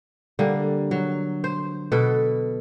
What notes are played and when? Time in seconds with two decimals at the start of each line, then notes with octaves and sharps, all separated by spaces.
0.39 D3 G3 A#3
0.91 F#3
1.44 C5
1.92 B2 A4 B4